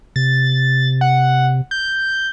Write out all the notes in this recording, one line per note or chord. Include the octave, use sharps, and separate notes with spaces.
C3 A6
F#5
G6